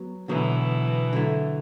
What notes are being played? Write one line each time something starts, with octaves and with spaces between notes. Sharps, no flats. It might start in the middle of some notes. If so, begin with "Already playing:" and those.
Already playing: F#3 B3
B2 D3 E3 F#3 B3
D3 F#3 A3 E4